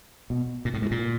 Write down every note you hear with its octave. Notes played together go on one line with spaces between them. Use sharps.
B2
A#2
A2
G#2
A#2